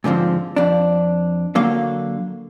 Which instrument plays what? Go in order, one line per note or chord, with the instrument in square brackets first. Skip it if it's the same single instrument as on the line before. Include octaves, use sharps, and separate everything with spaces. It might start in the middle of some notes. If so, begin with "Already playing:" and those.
[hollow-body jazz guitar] G#2 D3 E3 F3 C4
F2 D4
D3 F#3 A#3 F5